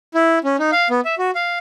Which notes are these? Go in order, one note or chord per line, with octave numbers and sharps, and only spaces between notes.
E4
C#4
D#4
F5
B3
E5
F#4
F5